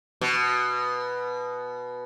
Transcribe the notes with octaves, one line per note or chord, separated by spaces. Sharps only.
B2